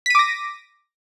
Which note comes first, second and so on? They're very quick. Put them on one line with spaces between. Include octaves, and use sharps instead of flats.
B6 D#7 D6 A#6